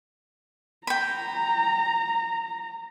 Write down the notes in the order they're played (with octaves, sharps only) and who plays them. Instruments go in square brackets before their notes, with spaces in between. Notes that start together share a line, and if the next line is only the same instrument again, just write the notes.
[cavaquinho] G5 B5 [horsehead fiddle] A#5